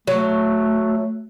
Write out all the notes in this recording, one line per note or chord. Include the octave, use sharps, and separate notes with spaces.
F#3 A3